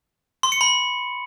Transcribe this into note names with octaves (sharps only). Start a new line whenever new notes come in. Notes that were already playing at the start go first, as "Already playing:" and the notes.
C6
C#7
B5